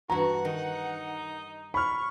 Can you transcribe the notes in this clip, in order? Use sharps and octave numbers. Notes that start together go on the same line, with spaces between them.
G2 E3 F#4 F#5 A#5
D#3 D#4
B5 C#6 F6